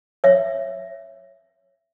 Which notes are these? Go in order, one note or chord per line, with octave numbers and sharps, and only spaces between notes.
C#5 E5